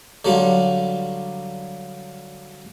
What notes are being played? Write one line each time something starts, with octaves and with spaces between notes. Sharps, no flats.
D3 F#3 G3 F4